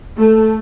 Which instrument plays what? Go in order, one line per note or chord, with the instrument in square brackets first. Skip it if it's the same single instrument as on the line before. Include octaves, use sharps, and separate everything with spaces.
[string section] A3